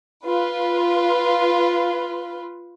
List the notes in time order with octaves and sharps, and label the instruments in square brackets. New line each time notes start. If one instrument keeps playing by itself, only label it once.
[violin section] F4 B4